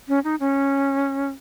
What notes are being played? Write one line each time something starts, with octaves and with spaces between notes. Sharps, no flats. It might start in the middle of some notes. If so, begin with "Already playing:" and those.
C#4
D#4
C#4